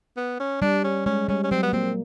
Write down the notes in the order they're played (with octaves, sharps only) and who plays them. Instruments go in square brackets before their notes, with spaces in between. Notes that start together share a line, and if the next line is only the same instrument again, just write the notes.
[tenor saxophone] B3
C#4
[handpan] G3 [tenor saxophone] D4
[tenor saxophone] C#4
[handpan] G#3 [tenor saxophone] C#4
[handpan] G3 [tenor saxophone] C#4
[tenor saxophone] C#4
[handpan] F#3 [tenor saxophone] C4
[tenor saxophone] B3
[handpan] A#3 [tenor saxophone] C4